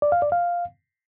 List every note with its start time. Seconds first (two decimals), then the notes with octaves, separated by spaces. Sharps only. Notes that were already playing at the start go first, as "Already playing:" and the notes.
0.02 D5
0.12 F5
0.22 D5
0.32 F5